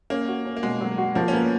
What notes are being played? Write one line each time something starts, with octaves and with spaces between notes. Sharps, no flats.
A#3 C#4
F#4
C#4
A#3
B2 G#3
F#3
F#4
F3 A#3
C#4
A#3 B3